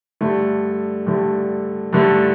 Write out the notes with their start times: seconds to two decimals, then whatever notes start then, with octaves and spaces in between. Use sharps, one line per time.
0.21 G2 D3 A3
1.07 G2 D3 A3
1.93 G2 D3 A3